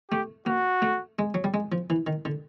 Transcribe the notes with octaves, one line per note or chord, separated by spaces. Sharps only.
A3 G4
A#3 F#4
A3
G#3
F#3
G3
G#3
F3
E3
D#3
D3